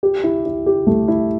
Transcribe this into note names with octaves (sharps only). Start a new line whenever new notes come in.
G4
E4
E4
G4
A3
E4